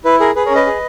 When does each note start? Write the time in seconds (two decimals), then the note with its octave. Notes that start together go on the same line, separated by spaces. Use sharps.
0.04 E4 B4
0.20 G#4 A#4
0.36 G#4 B4
0.45 A#4 C#5
0.50 C#4
0.55 B4 D#5
0.66 G#4